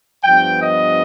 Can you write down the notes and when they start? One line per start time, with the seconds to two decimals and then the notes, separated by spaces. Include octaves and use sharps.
0.24 G2 F3 B3 G5
0.62 D#5